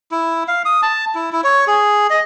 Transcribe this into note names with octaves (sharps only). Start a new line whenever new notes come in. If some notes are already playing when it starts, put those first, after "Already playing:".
E4
F5
D#6
A5
E4
E4
C#5
G#4
D#5